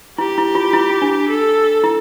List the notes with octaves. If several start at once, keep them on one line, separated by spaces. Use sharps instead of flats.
E4 G4
E4
F4
E4
D4
A4
E4